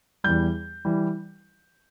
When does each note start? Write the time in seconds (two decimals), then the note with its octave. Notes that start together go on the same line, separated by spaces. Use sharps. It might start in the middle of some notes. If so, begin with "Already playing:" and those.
0.24 E2 E3 G3 G6
0.85 E3 G3